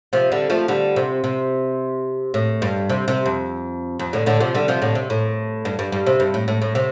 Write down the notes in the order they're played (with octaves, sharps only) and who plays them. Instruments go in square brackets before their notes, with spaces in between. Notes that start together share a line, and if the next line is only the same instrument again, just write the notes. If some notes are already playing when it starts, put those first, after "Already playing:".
[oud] C3 F3
D3 G3
F3 A3
D3 G3
C3
C3
A2
G2
C3
C3
F2
F2
A2 D3
A2 D3
C3 F3
D3 G3
C3 F3
A2 D3
C3
A2
G2
G2
G2
C3
G2
A2
A2
A2
C3